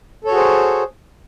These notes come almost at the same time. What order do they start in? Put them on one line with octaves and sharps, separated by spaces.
A4 C#5 F#4 G#4 C5